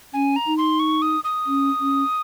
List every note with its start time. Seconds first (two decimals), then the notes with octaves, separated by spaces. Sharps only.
0.14 C#4 G#5
0.36 A#5
0.46 D#4
0.58 C6
0.80 C#6
1.02 D#6
1.24 D#6
1.47 C#4
1.80 C#4